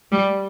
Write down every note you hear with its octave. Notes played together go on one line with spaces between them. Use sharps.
G3